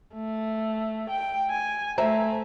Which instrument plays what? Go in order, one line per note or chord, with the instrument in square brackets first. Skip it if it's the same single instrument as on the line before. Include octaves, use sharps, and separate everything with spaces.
[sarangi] A3
G5
G#5
[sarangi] A3 [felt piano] C5 E5 A#5